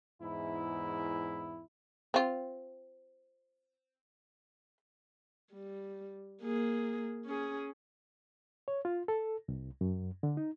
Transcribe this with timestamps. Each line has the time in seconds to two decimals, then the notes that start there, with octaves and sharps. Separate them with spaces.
0.21 E2 G#2 E4
2.14 C4 F4
5.52 G3
6.42 A#3 G#4
7.25 C#4 G#4
8.68 C#5
8.85 F4
9.08 A4
9.48 C2
9.81 F#2
10.23 D3
10.37 D#4